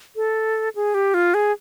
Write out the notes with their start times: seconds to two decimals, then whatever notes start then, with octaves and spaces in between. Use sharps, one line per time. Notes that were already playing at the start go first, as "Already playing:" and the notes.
0.16 A4
0.75 G#4
0.94 G4
1.14 F4
1.34 G#4